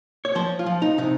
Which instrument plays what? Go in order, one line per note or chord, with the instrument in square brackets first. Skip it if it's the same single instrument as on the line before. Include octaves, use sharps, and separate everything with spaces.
[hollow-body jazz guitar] C#5
F3 C5
F4
F3
D#4
C3 D#4